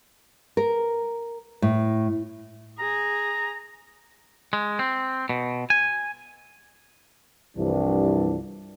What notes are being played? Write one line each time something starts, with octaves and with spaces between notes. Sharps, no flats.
A#4
A2
G#4 A#5
G#3
C4
B2
G#5
C2 G2 E3 F3 G3 D4